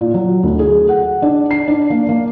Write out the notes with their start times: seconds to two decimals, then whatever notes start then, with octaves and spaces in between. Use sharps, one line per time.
0.01 A#2
0.14 F#3
0.43 D2
0.59 G#4
0.89 F#5
1.22 D4
1.51 C7
1.68 D4
1.90 A#3
2.09 A#3